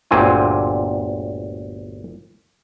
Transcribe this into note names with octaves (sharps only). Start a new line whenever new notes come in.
G1 D2 A#2 C4 G#5